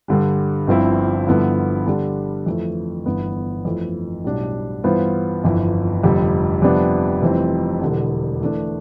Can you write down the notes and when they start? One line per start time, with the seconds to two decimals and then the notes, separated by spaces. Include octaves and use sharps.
0.08 G2 D3 G3
0.67 G1 G2 F3 C4 E4
1.27 G2 D3 F3 B3 E4
1.87 D3 G3 D4
2.46 F2 E3 A3
3.06 G1 G2 E3 B3
3.65 F2 E3 A3
4.24 B1 A2 G3 D4
4.84 G2 E3 B3 F4 C5
5.43 G1 F2 E3
6.03 F1 F2 D3 G3
6.62 F2 C3 G3 B3 D4
7.22 F1 F2 E3 G3 C4
7.81 E1 E2 D3 G3
8.41 E3 A3 D4